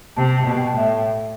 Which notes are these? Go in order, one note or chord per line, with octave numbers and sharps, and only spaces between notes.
C3 A5
A5
B2
G5
A2 E5